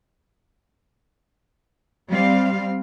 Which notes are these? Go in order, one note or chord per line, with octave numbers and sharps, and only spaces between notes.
G3 C4 F5